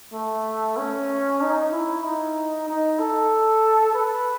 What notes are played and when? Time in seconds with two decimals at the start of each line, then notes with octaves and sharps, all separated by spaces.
0.13 A3
0.77 C#4
1.41 D#4
1.73 E4
2.04 D#4
2.68 D#4
2.99 A4
3.95 B4